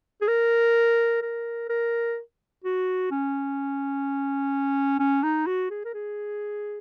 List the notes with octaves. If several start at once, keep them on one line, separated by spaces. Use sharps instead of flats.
G#4
A#4
A#4
A#4
F#4
C#4
C#4
D#4
F#4
G#4
A#4
G#4